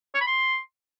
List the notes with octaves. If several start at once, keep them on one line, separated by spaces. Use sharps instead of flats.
C#5
B5
C6